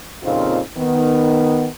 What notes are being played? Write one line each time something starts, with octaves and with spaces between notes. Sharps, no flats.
F2 A#2 C#3 C4 D#4 F4
D#3 B3